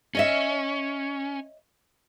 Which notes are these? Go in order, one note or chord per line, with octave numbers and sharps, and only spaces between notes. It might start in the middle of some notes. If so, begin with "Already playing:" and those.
C#4 C#5 D#5 E5